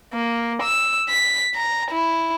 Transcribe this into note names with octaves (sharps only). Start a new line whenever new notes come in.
A#3
E6
B6
A#5
E4